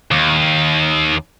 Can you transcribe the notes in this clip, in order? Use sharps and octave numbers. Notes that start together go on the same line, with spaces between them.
D#2